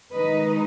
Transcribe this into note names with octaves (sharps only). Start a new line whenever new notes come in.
D#3 G#3 D#4 B4 D#5